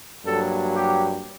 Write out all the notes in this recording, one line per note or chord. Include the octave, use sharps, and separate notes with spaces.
G2 F#3 A#3 A4
G4